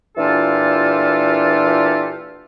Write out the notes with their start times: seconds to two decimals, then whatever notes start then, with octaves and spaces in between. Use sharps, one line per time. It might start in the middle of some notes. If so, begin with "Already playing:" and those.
0.17 A#2 E3 D4 F4 G4 A4